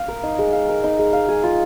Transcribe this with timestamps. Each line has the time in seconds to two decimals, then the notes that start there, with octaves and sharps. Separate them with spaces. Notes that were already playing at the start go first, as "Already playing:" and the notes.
Already playing: F5
0.08 A#4
0.23 D#4
0.38 G#3
0.53 F5
0.69 A#4
0.84 D#4
0.99 G#3
1.13 F5
1.28 G#4
1.43 F4